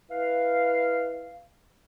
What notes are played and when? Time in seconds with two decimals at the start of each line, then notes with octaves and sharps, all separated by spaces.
0.10 E4 B4 F5